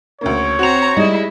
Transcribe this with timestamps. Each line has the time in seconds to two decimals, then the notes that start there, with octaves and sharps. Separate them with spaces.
0.21 D2 C#3 A#3 C#5
0.59 C4 F#4 A#5 C#7 F7
0.97 G3 G#3 D#4 E4 D5 D#5